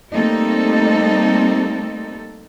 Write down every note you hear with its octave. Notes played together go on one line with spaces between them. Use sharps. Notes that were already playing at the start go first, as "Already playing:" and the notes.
G3 A3 A#3 C4 D#4 A4